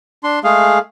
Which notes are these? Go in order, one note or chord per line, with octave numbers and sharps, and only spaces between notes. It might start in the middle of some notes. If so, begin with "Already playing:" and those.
D4 C6
G#3 A3 G#4 F5